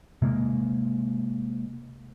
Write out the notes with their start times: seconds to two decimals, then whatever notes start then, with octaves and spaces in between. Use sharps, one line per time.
0.22 C3 G#3 A#3